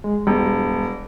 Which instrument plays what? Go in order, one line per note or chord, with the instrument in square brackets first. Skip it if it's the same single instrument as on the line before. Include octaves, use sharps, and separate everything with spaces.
[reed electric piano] G#3
[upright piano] E1 [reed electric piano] G3